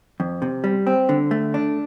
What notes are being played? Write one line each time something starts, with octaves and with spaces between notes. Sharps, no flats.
F2
C3
G3
C4
D3
A3
D4